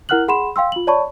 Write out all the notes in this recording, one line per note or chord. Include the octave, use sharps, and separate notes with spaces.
E4 A#4 F#5 F6 F#6 F#7
G#4 F#5 B5 C6 E7
F5 G5 C6 E6
F4 F#7
C#5 D5 A5 B5 C#6